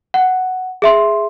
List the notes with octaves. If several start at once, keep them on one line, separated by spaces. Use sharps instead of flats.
F#5
G#4 E5 C6